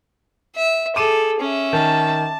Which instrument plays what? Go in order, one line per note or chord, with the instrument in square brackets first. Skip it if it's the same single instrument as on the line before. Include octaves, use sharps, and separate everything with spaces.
[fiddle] E5
[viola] G#4 [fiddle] A4 [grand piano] D6 D#7 E7
[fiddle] C#4 E5
[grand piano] D#3 [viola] A5